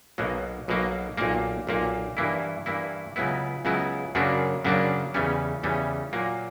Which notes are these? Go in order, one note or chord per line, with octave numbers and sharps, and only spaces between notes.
B1 B2 F#3 A#3
B1 B2 F#3 A#3
B1 A#2 A#3
B1 A#2 A#3
G2 E3 A#3 E4
G2 E3 A#3 E4
C#2 C#3 F#3 B3 E4
C#2 C#3 F#3 B3 E4
F#2 C#3 F#3 A#3 D4
F#2 C#3 F#3 A#3 D4
E2 C#3 E3 G3 C#4
E2 C#3 E3 G3 C#4
A#2 F#3 A#3